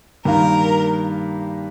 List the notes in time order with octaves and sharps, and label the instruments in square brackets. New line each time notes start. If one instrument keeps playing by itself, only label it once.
[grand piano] G2 D#3 A#3 F4 [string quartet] A#4